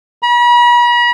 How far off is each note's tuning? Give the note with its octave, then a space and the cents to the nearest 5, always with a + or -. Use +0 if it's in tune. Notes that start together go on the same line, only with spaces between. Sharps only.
B5 -45